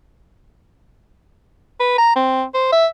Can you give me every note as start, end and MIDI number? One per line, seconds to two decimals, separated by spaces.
1.80 1.98 71
1.98 2.16 82
2.16 2.44 60
2.54 2.68 72
2.72 2.87 76